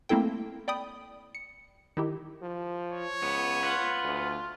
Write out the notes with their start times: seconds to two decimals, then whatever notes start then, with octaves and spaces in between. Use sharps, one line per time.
0.09 A3 A#3 C4 E4 A4 G5
0.68 D5 G5 B5 D#6
1.35 C#7
1.97 D#3 E4 G4
2.42 F3
2.92 C#5
3.22 C#2 B3
3.64 F4 B4 F#5
4.04 D2